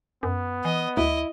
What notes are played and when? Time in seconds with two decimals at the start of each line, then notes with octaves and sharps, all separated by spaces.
0.23 F#2 B3
0.65 E3 D#5
0.97 D2 E4 D#5